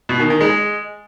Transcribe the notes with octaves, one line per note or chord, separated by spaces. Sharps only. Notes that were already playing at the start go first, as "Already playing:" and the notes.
B2
D#3
D#3
G#3